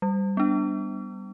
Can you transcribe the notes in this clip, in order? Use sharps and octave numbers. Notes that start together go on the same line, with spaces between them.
G3
B3 D4